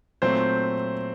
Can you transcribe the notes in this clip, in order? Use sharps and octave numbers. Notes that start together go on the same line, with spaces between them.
A#2 F#3 A3 C4 C5